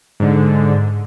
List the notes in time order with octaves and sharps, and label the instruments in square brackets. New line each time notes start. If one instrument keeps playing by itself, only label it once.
[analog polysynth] G#2 D3